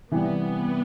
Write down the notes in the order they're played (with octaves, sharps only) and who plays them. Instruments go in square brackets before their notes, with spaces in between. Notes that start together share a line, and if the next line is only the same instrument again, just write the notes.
[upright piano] C3 E3 G3 [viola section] B3